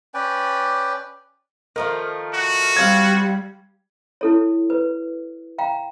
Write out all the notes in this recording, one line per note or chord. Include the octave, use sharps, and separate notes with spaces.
C#4 B4 D5 G5
D#3 F3 A3 A#4
F#4
G3 C4 F5 G#6
E4 A4 C#5
B4
F5 G5 A#5